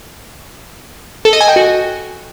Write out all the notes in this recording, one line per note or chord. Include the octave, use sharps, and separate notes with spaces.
A4
D#5
G#5
G5
F#4